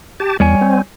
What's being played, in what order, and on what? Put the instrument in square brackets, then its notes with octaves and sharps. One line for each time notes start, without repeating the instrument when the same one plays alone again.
[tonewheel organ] G4 A5
[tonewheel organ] E2 [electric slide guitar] G3 C#5 G#5
[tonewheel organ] C4